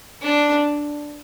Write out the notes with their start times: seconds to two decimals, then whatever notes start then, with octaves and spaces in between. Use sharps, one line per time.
0.22 D4